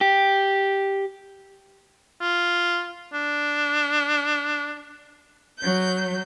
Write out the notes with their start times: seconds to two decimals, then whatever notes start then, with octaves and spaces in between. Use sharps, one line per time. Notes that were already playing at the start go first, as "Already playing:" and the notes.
0.01 G4
2.21 F4
3.13 D4
5.58 F#3 G6